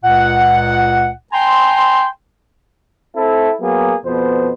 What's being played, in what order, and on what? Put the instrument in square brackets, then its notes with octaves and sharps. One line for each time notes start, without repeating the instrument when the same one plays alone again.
[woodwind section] C#2 A#2 F#5
G5 G#5 A#5 C6
[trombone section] C4 E4 A4
F#3 A#3 B3 G#4
F2 B2 B3 C5